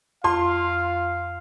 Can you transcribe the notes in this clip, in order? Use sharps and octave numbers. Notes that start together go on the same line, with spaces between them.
F2 F4 F5 C6